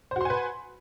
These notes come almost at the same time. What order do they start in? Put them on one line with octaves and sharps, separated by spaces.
C5 F#4 C6 G#5 B4